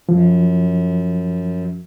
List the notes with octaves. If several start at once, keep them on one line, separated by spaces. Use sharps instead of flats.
F#2 F3